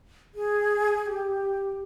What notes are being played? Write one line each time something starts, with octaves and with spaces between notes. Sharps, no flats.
G#4
G4